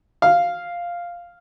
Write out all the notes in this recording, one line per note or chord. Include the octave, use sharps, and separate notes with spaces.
F5